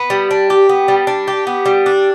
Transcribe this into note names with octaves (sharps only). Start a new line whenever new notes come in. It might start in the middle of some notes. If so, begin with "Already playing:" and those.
Already playing: B3
G3
D4
G4
B3
G3
D4
G4
B3
G3
D4